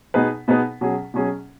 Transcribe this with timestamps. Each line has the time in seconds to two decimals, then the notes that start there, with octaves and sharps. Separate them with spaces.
0.14 B2 B3 D#4 G#4 B4
0.48 B2 B3 D#4 G#4 B4
0.81 B2 F#3 C#4 G#4
1.14 B2 F#3 C#4 G#4